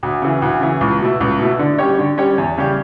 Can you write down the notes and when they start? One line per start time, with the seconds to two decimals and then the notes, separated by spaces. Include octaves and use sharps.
0.03 D2
0.22 C#3 E3
0.42 D2
0.61 C#3 E3
0.81 C#2
1.00 B2 A3 E4
1.21 C#2
1.39 B2 A3 E4
1.59 D3
1.78 G3 C#4 G4 C#5
1.99 D3
2.18 G3 C#4 G4 C#5
2.38 E2
2.58 C#3 G3 C#4 G4